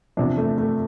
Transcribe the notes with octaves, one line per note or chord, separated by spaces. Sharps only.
E2 C3 F3 D4
A3
A3